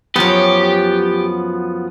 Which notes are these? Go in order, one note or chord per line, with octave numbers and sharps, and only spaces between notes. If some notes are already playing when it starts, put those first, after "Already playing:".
F#2 F3 F#3 B3 G4